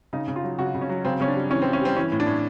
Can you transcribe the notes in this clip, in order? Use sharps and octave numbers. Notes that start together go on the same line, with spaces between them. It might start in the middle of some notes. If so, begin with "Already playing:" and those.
C#3 D#4
C#3
F4
F#3
C#3 F#4
C#3
C#4
F#3
C#3 C4
C#3 C#4
D4
G3
E3 C#4
C4
E3
C#4
G3 C4
E3 C#4
A2
D4
A2